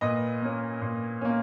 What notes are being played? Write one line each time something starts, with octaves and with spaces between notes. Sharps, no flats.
A#2 B4 D#5
A#3 C#4
A#2
A#3 C#4